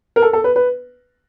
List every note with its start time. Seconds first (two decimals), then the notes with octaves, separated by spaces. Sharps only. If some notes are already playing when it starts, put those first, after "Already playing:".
0.16 A#4
0.22 A4
0.33 A4
0.44 B4
0.56 B4